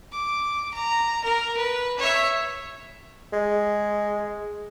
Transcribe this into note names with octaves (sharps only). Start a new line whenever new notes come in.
D6
A#5
A#4
B4
C#5 E5
G#3